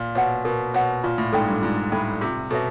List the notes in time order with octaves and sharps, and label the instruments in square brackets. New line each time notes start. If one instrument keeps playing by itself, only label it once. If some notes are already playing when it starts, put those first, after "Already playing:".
Already playing: [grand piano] A#2
[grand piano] B2 [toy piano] C#5 F#5
[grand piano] B2 [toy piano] A#4
[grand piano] B2 [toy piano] C#5 F#5
[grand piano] A#2 [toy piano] F4
[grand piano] A2
[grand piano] G#2 [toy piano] A4 D5 G5 B5
[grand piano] G2
[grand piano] G#2 [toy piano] F4
[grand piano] A2 [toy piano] A4 D5 G5 B5
[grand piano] C3 [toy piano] F4
[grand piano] B2 [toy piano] A4 C#5 E5